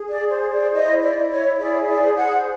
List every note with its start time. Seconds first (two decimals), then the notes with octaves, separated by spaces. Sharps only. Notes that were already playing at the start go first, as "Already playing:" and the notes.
Already playing: G#4
0.09 D5
0.30 C5
0.52 D5
0.73 E4 D#5
1.02 D5
1.16 E4
1.31 C#5
1.59 G#4 D5
1.88 D5
2.02 C5
2.16 F#5